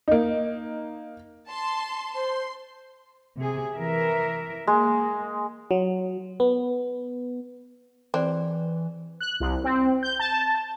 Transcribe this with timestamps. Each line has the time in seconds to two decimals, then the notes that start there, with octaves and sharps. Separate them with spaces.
0.08 A#3 D#4
1.49 A5 C6
2.14 C5 C6
3.38 C3 G#4
3.75 E3 A#4 E5
4.67 G#3 A#3
5.71 F#3
6.40 B3
8.14 E3 C4 G#4 C5 D5
9.20 F#6
9.40 C2
9.64 C4
10.03 G6
10.19 A5